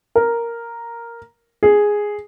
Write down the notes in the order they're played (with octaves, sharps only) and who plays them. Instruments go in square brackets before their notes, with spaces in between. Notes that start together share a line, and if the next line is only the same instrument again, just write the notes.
[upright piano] A#4
G#4